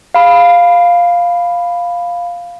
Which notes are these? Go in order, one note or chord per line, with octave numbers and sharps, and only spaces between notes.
F5 B5